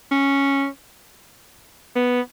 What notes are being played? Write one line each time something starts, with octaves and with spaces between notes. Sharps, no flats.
C#4
B3